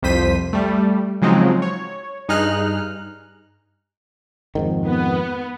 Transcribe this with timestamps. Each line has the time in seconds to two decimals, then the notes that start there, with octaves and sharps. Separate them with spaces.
0.03 C2 F2 C5 B6 D#7
0.53 G3 A3
1.22 C#3 F3 F#3 G#3 C4 D#4
1.62 C#5
2.29 G2 D#4 G#4 F6 F#6
4.55 F2 G#2 D#3
4.87 B3